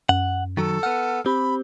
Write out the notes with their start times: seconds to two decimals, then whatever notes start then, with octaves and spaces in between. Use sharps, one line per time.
0.09 F#2 F#5
0.57 D#3 F#3 A4
0.83 B3 F#5 F6
1.26 C4 G4 B5